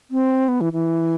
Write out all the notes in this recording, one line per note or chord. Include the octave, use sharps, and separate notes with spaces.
C4
B3
E3
E3